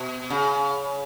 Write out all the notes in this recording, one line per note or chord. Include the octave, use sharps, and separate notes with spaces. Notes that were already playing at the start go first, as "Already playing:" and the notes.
Already playing: B2
C#3